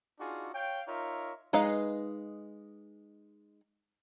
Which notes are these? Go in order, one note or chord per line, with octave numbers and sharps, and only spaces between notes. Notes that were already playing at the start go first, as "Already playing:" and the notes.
D4 D#4 F4 F#4 G#4
C#5 F5 G5
D#4 F4 A#4 C#5 E5
G#3 D#4 B4 D#5 F5